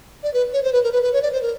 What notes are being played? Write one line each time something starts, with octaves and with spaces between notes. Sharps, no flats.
D5
B4
C#5
C5
B4
A#4
B4
B4
C#5
D5
C5
A#4